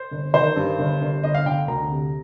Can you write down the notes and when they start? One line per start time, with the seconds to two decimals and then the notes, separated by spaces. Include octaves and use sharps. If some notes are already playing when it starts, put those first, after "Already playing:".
Already playing: C5
0.11 G1
0.34 D#3 C5
0.56 G2
0.79 G1
1.01 G1
1.23 G1 D#5
1.34 F5
1.46 D3 G5
1.68 D2 A#5
1.90 C3